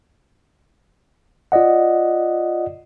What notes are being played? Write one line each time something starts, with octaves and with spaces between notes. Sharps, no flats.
F4 D5 D#5 F#5